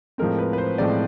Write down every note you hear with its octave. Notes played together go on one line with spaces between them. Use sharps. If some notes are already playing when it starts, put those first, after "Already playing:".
A2 F3 G#3 C4 A#4
B4
B4
C5
A2 F3 G#3 C4 D5